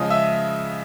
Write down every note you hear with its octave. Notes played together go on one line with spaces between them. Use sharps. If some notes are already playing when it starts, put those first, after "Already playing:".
Already playing: C#3 F3 G#3 C#4 D#5 D#6
E5 E6